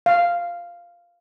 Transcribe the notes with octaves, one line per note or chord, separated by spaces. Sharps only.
F5